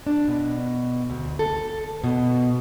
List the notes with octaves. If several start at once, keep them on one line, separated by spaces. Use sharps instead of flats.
D4
B2
D2
A4
B2